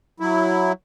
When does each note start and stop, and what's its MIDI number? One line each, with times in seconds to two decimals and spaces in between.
0.20 0.72 54
0.20 0.72 64